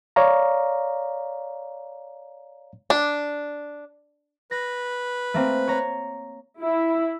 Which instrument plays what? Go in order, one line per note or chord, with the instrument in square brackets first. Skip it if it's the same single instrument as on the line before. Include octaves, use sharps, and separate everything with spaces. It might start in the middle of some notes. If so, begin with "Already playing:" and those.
[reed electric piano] C#5 D5 F5 A#5
[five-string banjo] D4
[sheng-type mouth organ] B4 [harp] A#6
[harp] A3 A#3 C4
C#5 A#5
[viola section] E4